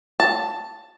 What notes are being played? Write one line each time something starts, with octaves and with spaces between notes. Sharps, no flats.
A5